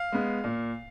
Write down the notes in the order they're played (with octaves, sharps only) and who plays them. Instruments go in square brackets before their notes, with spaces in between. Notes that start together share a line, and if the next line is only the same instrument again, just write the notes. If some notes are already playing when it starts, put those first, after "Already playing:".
Already playing: [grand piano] F5
G#3 B3
A#2